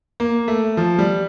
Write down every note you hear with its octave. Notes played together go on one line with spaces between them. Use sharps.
A#3
A3
F3
G3